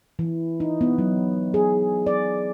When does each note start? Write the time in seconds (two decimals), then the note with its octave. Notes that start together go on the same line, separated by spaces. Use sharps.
0.19 E3
0.60 D#4
0.81 B3
0.98 F#3
1.54 G#4
2.07 D5